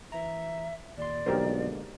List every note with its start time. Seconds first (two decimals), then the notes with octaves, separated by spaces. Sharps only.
0.12 E3 E5 A#5
0.98 D#2 A#2 D5 C6
1.26 B1 D3 G#3 A#3 G4 A#4 C5